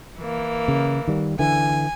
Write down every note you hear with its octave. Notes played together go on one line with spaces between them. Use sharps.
E3 A#3
C#3
D#3 G3
D3 E3 G#5